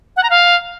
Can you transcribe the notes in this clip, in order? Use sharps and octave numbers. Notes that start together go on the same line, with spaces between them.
F#5
A#5
F5